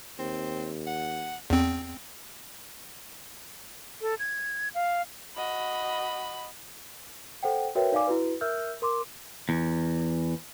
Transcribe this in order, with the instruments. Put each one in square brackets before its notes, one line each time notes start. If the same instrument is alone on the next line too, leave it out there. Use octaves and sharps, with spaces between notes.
[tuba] D#2 [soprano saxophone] C4
[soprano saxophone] F#5
[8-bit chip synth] E2 C4
[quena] A4
G#6
F5
[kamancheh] F#4 D#5 [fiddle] B5
[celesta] A4 C5 F#5 G5
F#4 A#4 B4 C#5 E5 G5
D#4 D5 F5 G#5 D6
E4 F#4 B4
A#4 E5 E6 F6 G6
A#4 C6 D6
[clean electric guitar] E2